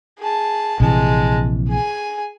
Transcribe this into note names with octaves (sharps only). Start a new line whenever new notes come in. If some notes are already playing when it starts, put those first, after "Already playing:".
G#4 A5
A#1 C3 E3 G#3 A5
G#4 G#5